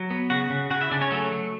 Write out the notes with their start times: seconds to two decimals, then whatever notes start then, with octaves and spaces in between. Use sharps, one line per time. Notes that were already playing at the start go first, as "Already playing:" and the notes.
Already playing: F#3
0.10 B3
0.30 C#3 F#4 F#5
0.50 C#3
0.70 C#3 F#4 F#5
0.81 E4 E5
0.91 C#3 D4 D5
1.01 C#4 C#5
1.11 F#3 A3 A4
1.32 F#3